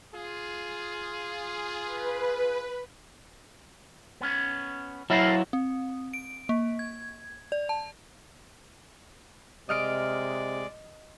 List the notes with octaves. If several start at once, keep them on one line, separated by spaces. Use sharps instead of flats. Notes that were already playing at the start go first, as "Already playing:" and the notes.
F4 G#4
B4
B3 C#4
F#3 E4 A4 A#4 F5
C4
D7
A#3
G#6
D5
A5
C3 G#3 D5 D#5 F6 D7